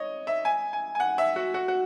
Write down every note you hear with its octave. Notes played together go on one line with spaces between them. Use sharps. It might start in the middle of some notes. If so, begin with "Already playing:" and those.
Already playing: C#5 D#5
E5
G#5
G#5
G#5
F#5
E5
F#4
F#4
F#4